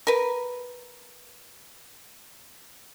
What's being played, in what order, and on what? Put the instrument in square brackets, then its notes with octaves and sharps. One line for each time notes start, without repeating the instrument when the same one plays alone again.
[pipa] A#4 B4